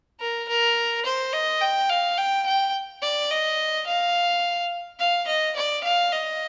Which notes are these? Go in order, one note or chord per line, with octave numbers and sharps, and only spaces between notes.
A#4
A#4
C5
D#5
G5
F5
G5
G5
D5
D#5
F5
F5
D#5
D5
F5
D#5